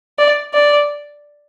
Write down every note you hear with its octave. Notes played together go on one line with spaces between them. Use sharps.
D5
D5